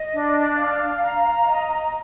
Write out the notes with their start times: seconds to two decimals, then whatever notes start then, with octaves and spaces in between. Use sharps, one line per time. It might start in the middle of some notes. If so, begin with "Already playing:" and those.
Already playing: D#5
0.14 D4
0.57 F5
1.01 A#5
1.45 D#5